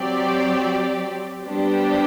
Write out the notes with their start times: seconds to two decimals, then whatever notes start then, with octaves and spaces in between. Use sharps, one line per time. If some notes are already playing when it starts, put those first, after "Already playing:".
Already playing: F#3 C4 G4 D5
1.45 G3 B3 D4 G4 C5